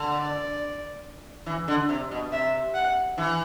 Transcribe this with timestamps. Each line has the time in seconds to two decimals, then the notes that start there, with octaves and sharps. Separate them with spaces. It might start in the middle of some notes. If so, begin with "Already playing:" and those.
Already playing: D3
0.18 D5
1.46 E3
1.68 D3
1.89 C3
2.11 B2
2.32 C3 E5
2.74 F#5
3.18 E3